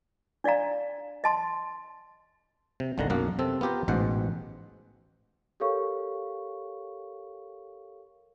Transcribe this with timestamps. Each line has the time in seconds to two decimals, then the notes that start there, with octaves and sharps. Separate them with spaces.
0.44 D4 D5 D#5 F5 A#5
1.24 D#5 A5 C6
2.80 C3
2.98 G1 C2 D3 D#3 F#5 A#5
3.10 B1 F#2 A#3 F#5
3.39 C3 C4 A4
3.61 B3 F4 G4 A#4 C5
3.88 A1 G#2 B2 C5 F#5
5.60 G4 A4 A#4 C#5 F5 C#6